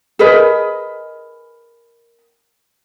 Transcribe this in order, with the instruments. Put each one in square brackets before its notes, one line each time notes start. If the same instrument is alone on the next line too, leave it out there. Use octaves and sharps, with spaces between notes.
[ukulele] G#4 A#4 B4 D#5